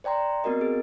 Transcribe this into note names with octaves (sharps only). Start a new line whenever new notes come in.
C5 D5 G5 A#5 C6
B3 C4 F#4 A#4 D#5
G#4